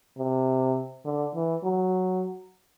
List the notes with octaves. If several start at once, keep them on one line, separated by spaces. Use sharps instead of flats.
C3
D3
E3
F#3